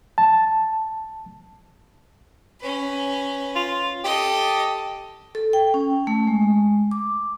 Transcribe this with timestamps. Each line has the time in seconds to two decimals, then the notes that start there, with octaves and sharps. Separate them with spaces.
0.18 A5
2.61 C#4 B4
3.56 F4
4.04 G4 A4 D#5
5.35 A4
5.53 G5
5.74 C#4
6.07 A3
6.27 G#3
6.91 D6